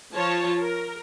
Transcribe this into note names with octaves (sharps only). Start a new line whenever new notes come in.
F3 F4 C#5 A5
A#4